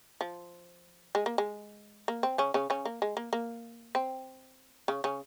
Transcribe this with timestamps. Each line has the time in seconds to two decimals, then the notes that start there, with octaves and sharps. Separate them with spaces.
0.21 F3
1.15 G#3
1.26 A#3
1.38 G#3
2.08 A#3
2.23 C4
2.38 C#3 C#4
2.54 C#3 C#4
2.70 C#3 C#4
2.85 A#3
3.02 G#3
3.17 A#3
3.33 A#3
3.95 C4
4.88 C#3 C#4
5.04 C#3 C#4